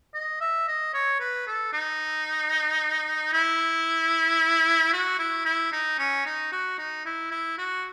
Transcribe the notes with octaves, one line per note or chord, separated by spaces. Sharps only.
D#5
E5
D#5
C#5
B4
A4
D#4
E4
F#4
E4
E4
D#4
C#4
D#4
F#4
D#4
E4
E4
F#4